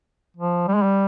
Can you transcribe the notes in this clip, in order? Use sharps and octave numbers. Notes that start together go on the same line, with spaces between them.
F3
G3
G#3
G3